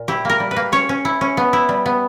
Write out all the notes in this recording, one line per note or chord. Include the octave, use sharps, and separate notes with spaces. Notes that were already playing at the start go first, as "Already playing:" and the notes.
Already playing: A#2
E4 G4
A#3 A#4
G3
B4
A#3
C#4 C#5
C#4
E4
C#4
B3
E4
G3
B3